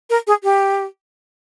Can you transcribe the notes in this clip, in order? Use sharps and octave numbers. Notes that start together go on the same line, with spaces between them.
A#4
G#4
G4